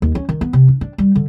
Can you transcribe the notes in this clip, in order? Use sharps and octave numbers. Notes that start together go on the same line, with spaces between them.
D#2
C#4
D#3
B3
C3
D4
D4
G3
D3